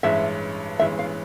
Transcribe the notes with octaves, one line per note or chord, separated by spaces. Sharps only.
A1 G2 E3 G#3 C#4 E5
A1 G2 E3 G#3 C#4 E5
F5